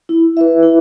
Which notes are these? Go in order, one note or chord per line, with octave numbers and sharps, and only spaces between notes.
E4
B4 E5
E4